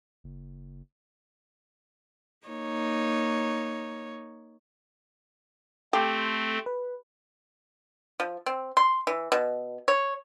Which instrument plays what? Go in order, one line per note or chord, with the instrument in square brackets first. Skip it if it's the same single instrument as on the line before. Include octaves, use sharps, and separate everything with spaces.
[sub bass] F#1
[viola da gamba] A#3 D#4 C#5
[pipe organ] A3 C4 [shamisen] G4 [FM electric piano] A4 C6 G6
[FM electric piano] B4
[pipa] F3
C4
C6
E3
B2
C#5